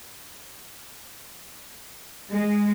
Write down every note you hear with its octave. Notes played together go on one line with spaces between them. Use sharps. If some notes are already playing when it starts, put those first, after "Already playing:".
G#3